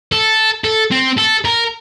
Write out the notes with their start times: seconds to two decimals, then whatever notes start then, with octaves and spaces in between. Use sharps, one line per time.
0.12 A4
0.64 A4
0.92 C4
1.18 A4
1.45 A#4